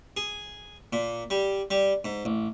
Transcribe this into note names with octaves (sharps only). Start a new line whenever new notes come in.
G#4
A#2
G3
G3
G#2
A1